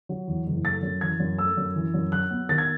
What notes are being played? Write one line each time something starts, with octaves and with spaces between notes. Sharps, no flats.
F#3
E2
F#1
A3 A6
F#2
E3 G#6
F#2
A3 E6
F#2
E3
F#2
F#3 F#6
B3
D#3 A6
G#6